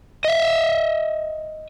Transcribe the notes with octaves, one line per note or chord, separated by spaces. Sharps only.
D#5 E5